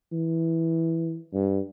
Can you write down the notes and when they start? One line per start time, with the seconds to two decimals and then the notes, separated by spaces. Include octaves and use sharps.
0.12 E3
1.33 G2